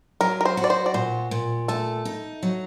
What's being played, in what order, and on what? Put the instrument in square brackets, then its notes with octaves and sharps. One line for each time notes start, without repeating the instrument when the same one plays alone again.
[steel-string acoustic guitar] F#3 [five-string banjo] A#4
[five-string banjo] A#4
C5
[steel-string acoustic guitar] F#4
[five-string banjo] D5
C5
D5
[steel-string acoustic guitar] A#2 [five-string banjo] C5
[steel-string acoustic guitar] A#2
[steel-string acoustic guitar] A3 [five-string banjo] A4
[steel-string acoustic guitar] D#4
F#3